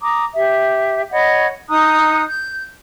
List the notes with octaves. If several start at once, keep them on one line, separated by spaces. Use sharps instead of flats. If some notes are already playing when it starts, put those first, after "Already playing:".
A#5 D6 D#6
G4 E5
C#5 D#5 F#5 B5
D#4 A#5 D#6 F#6
G6